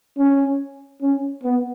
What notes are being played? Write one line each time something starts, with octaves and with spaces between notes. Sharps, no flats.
C#4
C#4
B3